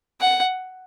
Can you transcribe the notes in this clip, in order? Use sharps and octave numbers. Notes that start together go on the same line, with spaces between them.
F#5